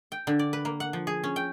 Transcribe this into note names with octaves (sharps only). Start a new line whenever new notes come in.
G5
D3
D5
B4
A#3
F#5
F3
G#4
C#4
G5